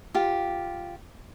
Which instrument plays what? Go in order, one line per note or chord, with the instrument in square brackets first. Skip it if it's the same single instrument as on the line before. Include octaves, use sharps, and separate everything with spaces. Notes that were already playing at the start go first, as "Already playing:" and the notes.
[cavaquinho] F4 G4